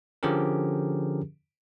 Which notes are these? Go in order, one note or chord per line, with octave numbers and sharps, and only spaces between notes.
D3 F3 C#4 G4 G#4 A#4